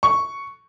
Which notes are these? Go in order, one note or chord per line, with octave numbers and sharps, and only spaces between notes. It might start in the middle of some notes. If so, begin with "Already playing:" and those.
C#6